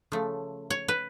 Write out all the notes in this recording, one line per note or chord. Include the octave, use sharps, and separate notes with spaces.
C#3 F3 A3
C#5
B4